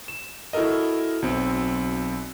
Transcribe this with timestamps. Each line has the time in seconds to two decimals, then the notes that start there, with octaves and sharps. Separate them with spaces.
0.08 E7
0.53 E4 F#4 A4 A#4 D#5
1.22 B1 F#3 C4